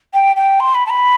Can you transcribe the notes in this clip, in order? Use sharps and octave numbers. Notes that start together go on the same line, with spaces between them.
G5
G5
C6
B5
A5
B5